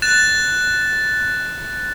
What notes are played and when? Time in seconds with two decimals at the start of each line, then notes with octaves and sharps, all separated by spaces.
0.02 F#6 A6 E7